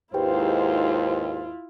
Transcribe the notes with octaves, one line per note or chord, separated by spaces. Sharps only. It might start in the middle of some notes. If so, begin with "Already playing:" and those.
D#2 G#2 E4 F4 G4 B4 C5 G5